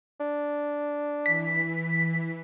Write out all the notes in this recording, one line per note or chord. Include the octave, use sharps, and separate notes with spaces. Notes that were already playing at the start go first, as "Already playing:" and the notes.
D4
E3 B6